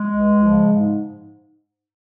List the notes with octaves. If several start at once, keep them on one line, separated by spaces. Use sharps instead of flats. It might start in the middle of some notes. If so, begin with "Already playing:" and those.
Already playing: G#3
C#2
C#3 F3
G#2